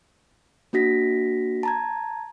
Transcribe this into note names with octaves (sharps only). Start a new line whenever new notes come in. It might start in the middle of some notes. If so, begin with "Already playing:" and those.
A#3 D4 F#4 A#6 B6
A5 A#5 G#6